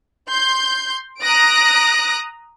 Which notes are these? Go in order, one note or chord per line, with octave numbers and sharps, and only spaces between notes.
C6 G6
A#5 D#6 F#6 A#6 D7